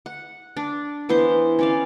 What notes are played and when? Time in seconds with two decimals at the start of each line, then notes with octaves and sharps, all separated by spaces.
0.06 F#5
0.57 D4
1.09 E3 B3 E4 C5
1.59 C#4 D5 F5